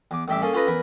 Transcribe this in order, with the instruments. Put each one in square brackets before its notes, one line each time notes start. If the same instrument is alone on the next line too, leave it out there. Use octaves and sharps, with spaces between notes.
[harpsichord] E2 D6
A1 G2 G4 E5 D6
A#3 C#4 G#4 A4
C#4 F4 A4 B4 D#5
E2 A#4 B4